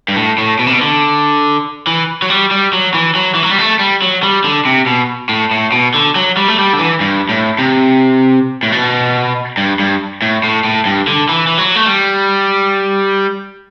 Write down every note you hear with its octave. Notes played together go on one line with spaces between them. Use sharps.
G2
A2
A2
B2
C3
B2
D3
E3
F#3
G3
G3
F#3
E3
F#3
E3
F#3
G3
A3
G3
F#3
G3
D3
C3
B2
A2
A2
B2
D3
F#3
G3
A3
G3
D3
E3
G2
A2
C3
A2
B2
G2
G2
A2
A2
A2
G2
D3
E3
E3
F#3
A3
G3